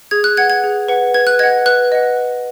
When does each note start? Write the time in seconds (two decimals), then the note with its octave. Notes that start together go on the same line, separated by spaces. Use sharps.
0.11 G#4 G#6
0.24 F#6
0.37 B4 F#5 G#6
0.50 G#6
0.64 G#4
0.89 B4 F#5
1.14 B4 G#6
1.27 F#6
1.39 D#5 F#5 G#6
1.66 B4 F#6
1.92 D#5 F#5
2.17 B4